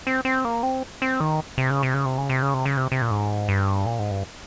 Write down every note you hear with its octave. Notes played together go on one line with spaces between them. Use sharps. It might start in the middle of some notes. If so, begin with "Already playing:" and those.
C4
C4
A#3
C4
C4
D#3
C3
C#3
C3
C#3
C3
C#3
C3
C#3
C3
C#3
C3
C3
A#2
G#2
G2
A#2
G#2
G2